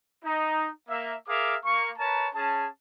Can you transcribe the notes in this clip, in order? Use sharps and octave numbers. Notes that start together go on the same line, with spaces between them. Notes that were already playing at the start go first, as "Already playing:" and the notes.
D#4
A#3 E5
G#4 A#4 E5 F5 D6
A#3 C#6
A#4 B4 C#5 A5 A#5
C#4 G#4 A5